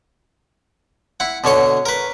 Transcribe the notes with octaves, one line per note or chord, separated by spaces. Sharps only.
E4 F#5
B2 D3 C#5 C#6
A#4 B4